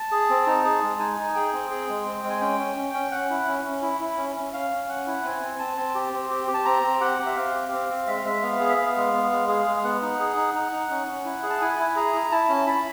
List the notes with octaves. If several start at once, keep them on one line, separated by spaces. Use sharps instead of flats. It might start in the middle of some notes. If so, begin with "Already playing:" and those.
Already playing: A5
G#4
C4
D#4
G#4
G#3
D#4 G#5
D#4
G#4 G5
C4
G#4
G#3
C4
G#3
G#5
C#4 G5
C#4
C#4
C#4
C#4 F#5
E4
C#4
C#4
E4
E4
C#4
C#4
C#4 F5
C#4
C#4 F#5
E4
C4 G#5
C4
C4 A5
C4
G4
C4
G4
G4
A5
C4 A#5
C4
G4 F#5
G4
E5
C4 F5
G4
C4
C4
G#3 E5
F5
G#3 E5
B3 F5
G#4
E5
B3 F5
G#3
B3
G#3
G#4 F5
G#3
F5
B3 F#5
D#4
G#4
D#4
D#4
D#4
C#4
C#4
E4
G#4
A5
E4 G#5
E4
G#4 A#5
E4
E4 A5
C#4
E4 B5